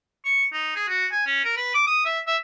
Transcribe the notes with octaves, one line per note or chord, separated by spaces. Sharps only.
C#6
D#4
G#4
F#4
G#5
C#4
A#4
B4
D6
D#6
E5
E5